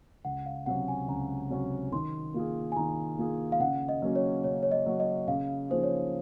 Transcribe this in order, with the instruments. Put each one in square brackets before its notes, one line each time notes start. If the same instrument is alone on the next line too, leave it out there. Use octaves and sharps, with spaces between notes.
[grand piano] C#2 [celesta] F#5
[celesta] F5
[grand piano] C3 F#3 C#4 F#4 [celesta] F#5
[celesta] G#5
[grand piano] C#2 [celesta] A#5
[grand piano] C3 F#3 C#4 F#4
[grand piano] D#3 [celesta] C6
[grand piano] A#3 F4 G#4
[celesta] G#5
[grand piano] D#3 [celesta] A#5
[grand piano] A#3 F4 G#4
[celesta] F5
[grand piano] C#3 [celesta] F#5
[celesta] D#5
[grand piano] F#3 A#3 C#4 F#4
[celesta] C#5
[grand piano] C#3 [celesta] C#5
[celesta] C#5
D#5
[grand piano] F#3 A#3 C#4 F#4
[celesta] D#5
[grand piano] C#3 [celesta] F5
[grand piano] F3 A#3 D#4 G#4 [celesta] C5
[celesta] C#5